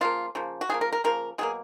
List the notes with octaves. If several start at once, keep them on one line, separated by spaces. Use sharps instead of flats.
C#3 F3 A#3 F4
C#3 F3 A#3
F#4
C#3 F3 A#3 G#4
A#4
A#4
C#3 F3 A#3 A#4
B2 F#3 A#3 G#4